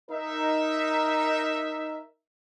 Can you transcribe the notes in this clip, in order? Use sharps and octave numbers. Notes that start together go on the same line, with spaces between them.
D#4 A#4 E5